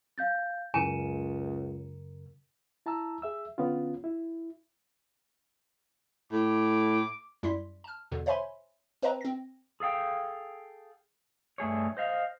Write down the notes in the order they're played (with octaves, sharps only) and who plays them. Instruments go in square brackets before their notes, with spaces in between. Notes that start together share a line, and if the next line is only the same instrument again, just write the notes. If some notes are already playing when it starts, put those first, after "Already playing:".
[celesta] F5 G6 A6
[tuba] C#2 [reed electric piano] F#2 C#3 A#4 [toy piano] G#5 [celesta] C#7 D#7 E7
[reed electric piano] E4 A5 A#5 E6
G#4 E5 E6
D3 B3 C#4 F4
E4
[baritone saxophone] A2 [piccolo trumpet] D6
[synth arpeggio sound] F#2 G3 E4 C6 B6
A5 F6
E2 B2 D3
C5 C#5 E5 G#5 B5 C6
C4 B4 C5 D#5 A5 A#5
C4 A#6
[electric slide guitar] G#4 A4 F5 G5
G2 A3 G#4 C#5
C5 D#5 F5